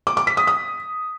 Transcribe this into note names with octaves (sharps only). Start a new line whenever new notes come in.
D6
D6
B6
D#6
D#6